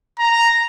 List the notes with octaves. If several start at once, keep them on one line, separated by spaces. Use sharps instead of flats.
A#5